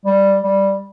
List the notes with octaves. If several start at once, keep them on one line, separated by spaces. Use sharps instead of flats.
G3
G3